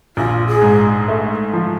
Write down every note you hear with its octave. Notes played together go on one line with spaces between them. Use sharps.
A#1 F4
G#4
G#2
A3
F3